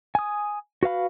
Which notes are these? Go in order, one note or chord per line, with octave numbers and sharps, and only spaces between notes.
G#5 D#6
F#4 B4 F5 B5